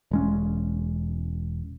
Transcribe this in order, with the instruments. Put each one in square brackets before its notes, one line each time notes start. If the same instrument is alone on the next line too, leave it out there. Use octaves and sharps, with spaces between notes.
[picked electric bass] E1 G#3 C#4